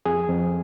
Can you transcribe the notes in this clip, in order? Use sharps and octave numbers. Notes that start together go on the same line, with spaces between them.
F2 G#4
F2